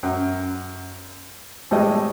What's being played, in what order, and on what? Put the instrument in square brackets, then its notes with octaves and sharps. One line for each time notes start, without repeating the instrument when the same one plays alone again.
[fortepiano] F#2
A2 G3 G#3 D#5